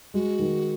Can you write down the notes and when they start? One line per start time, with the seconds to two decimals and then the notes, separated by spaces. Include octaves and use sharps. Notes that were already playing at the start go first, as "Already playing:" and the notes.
0.14 G#3 F#4
0.39 D#3